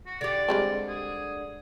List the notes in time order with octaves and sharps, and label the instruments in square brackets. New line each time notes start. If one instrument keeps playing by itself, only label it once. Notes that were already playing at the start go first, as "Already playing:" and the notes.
[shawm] F#4
[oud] D3 G4 [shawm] D5
[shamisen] G3 G#3 C4
[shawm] G#4